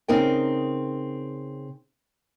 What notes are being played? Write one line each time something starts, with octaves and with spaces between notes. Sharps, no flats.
C#3 C4 D#4 A#4 G5